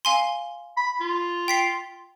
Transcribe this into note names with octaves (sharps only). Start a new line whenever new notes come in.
F5 G#5 C6
B5
F4
G5 B6 C7